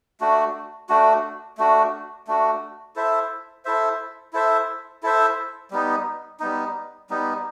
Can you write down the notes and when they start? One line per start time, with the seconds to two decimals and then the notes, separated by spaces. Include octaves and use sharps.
0.20 A3 D4 F#4
0.89 A3 D4 F#4
1.58 A3 D4 F#4
2.27 A3 D4 F#4
2.96 E4 A4 C5 E5
3.65 E4 A4 C5 E5
4.33 E4 A4 C5 E5
5.03 E4 A4 C5 E5
5.71 G3 B3 D#4
6.40 G3 B3 D#4
7.10 G3 B3 D#4